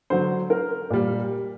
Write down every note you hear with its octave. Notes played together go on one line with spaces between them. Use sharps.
D3 F#3 C5
A#4
A#2 G3